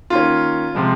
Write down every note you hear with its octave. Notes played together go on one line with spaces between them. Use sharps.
D#3 A#3 C#4 F4
C3 F3 G#3